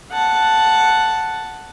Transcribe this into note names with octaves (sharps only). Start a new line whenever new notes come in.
F#5 A5